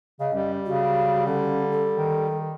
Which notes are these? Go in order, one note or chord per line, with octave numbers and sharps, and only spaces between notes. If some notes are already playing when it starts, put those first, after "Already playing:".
C#3 D#5
F#2 G3
C#3 F#4
D3 C#4
A4
D#3